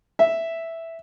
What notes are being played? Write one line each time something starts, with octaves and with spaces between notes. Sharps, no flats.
E5